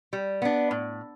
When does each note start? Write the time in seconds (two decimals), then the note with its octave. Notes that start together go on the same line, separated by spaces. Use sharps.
0.13 G3
0.42 B3 D4
0.71 A2